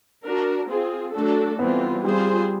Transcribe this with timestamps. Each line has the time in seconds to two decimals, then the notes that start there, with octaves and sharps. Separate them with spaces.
0.24 D4 F#4 A#4
0.69 C4 F4 G#4
1.14 F#3 A3 D4 F#4 A4
1.59 E3 G3 B3 C4 F4
2.04 G3 C4 F4 G#4 C5